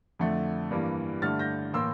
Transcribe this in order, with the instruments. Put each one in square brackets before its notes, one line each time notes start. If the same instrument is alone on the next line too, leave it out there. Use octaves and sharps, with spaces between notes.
[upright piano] F2 D3 A3
G2 E3 G3 A#3
G2 D3 A3 F6 A6
G6 A#6
A2 E3 A#3 C6 E6